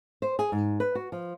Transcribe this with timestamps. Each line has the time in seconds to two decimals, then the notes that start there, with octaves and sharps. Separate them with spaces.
0.22 C5
0.39 G#4
0.52 G#2
0.80 B4
0.95 F#4
1.12 F3